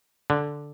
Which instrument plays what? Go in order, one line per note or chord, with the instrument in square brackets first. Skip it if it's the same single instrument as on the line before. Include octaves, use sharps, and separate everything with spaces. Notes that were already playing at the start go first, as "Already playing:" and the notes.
[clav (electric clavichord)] D3